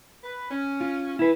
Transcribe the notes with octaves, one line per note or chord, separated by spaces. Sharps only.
B4
C#4
F4
E4 B4